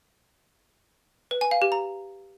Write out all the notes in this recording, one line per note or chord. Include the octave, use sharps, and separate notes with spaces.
B4
G#5
F5
G4
A#5